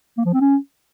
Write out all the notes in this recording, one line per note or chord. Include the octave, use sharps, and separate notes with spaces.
A#3
F3
C4
C#4